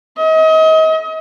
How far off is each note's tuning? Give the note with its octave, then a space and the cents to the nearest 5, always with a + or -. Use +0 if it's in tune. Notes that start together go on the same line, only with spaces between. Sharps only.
D#5 +35